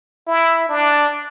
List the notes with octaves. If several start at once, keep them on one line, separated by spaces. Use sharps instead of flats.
E4
D4